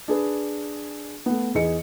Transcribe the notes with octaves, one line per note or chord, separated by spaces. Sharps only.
D4 G#4 B4
A3 B3
E2 G#4 D#5 C#7